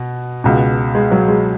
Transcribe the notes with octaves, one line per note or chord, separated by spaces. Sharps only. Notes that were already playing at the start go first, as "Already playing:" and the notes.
Already playing: B2
C#2 B2
G#3
F#3
G#3